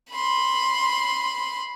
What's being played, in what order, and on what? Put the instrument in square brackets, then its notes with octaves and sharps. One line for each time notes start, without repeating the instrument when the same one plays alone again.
[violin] B5 C6